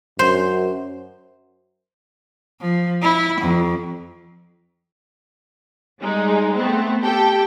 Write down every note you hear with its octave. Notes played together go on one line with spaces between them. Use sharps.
F#2 C5
F3
E4
F2
G3 G#3 D#4
A3 B3 C4
G4 A4 G5